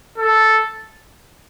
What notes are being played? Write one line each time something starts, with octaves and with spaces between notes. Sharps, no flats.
A4